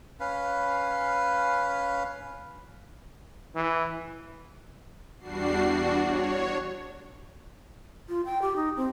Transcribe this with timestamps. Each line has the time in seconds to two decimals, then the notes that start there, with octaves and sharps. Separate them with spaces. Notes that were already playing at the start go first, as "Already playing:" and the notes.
0.20 C#4 B4 F5
3.55 E3
5.20 E2 G3 D4 F#4 C7
5.69 E2 D4 F#4
6.05 C#5
8.09 F4
8.26 G5
8.42 G4
8.56 D#4
8.77 C4